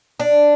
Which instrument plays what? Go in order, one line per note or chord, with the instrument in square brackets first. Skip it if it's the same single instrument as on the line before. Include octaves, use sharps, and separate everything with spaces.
[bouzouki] D4